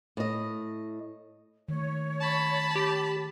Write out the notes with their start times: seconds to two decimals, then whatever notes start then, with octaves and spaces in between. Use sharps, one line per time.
0.17 A2 D#5
1.69 D#3 A3 C#5
2.21 A5 B5
2.75 G4